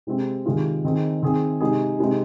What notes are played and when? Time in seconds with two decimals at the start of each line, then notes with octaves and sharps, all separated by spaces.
0.07 C3 G#3 C4
0.46 C3 D#3 G#3 F4 G#4
0.84 D#3 C4 D#4 G#4
1.22 D#3 C4 G#4
1.61 C3 G#3 D#4 G#4
1.99 C3 G#3 C4 D#4